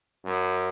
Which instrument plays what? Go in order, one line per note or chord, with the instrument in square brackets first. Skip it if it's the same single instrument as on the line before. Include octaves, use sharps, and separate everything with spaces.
[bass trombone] F#2